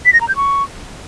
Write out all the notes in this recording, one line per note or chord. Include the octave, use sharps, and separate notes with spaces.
B6
A#6
A#5
G6
C#6